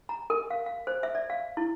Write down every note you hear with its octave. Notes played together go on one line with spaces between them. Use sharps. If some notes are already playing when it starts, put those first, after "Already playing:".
A#5
A#4
F5
F5
C5
E5
D5
F5
E4